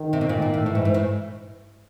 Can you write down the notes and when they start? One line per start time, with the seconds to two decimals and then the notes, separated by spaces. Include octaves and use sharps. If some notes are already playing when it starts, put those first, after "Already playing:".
Already playing: D#3
0.13 C3
0.21 B2
0.29 A#2 D#3
0.42 A#2
0.54 A2
0.66 A2 E3
0.75 G#2
0.85 G#2
0.94 A2